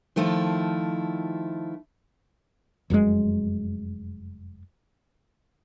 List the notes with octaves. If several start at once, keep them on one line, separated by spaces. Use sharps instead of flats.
D#3 F3 A3 E4 F4
F1 F#2 A#2 G#3